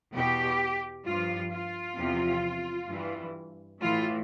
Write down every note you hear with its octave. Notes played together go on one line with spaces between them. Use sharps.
E2 B2 G4
G2 F3 F4
F4
E2 C3 F3
G2 E3
A2 E3 F4